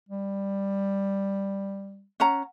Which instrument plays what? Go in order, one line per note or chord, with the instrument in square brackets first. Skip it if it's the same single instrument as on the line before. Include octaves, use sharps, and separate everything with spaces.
[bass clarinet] G3
[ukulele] C#4 F#5 A#5